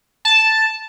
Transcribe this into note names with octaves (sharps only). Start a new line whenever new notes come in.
A5